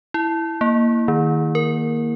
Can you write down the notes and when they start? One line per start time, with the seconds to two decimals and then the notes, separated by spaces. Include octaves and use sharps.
0.14 E4
0.61 A#3
1.08 D#3
1.55 A#4